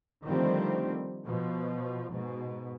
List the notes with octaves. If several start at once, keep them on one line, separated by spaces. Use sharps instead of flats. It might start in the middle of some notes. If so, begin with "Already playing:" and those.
D3 D#3 F3 G3 A3 C4
B2 F3
G#2 B2